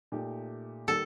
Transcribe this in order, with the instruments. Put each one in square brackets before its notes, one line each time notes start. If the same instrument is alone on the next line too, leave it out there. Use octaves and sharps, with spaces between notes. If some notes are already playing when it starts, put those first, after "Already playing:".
[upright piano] A#2 A3 D#4 G4
[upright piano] D#3 G3 A#3 [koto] A4